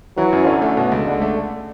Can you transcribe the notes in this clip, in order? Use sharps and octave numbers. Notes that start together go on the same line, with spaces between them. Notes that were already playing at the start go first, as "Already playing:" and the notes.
E3 F#3
F#2
D3 C#4
A3
B2 D3
C#2
C#2 D3
A3